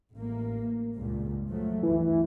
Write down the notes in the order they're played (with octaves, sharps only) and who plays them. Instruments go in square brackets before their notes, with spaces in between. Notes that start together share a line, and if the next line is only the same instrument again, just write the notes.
[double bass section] A1 A#3
C#2 G2 A#2
F3 F#3 A3
[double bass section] D2 G2 [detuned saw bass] E3